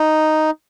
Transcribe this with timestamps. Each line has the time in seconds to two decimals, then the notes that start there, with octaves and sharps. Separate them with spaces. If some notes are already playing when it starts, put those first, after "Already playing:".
Already playing: D#4